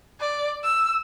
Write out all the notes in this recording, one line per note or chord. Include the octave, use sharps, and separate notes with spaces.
D5
E6